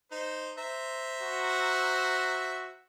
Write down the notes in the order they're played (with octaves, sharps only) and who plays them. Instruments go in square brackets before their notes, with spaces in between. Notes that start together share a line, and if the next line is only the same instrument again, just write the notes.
[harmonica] D#4 C5
C5 E5 A#5
[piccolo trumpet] F#4